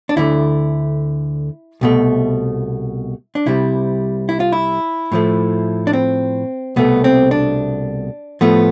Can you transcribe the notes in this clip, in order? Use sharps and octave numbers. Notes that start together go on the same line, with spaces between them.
D4
D2 D3 A3 E4
C2 B2 A3
D4
C2 C3 G3 E4
E4
F4
E4
A2 F3 A3
D4
C4
C2 B2 A3 B3
C4
D4
A2 F3 A3 B3